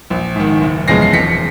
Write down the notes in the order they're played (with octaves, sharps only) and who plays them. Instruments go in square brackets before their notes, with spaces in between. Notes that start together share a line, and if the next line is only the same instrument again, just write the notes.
[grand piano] A#1
G#2 D#3
F#1
E2 C#3 F3 G#3 A#6 C7
C7
E1 B6 C#7